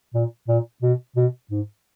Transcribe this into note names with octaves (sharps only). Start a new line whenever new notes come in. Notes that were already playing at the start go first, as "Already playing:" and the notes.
A#2
A#2
B2
B2
G#2